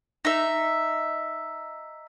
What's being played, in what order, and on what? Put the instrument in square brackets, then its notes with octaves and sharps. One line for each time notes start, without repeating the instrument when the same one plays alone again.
[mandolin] D#4 E5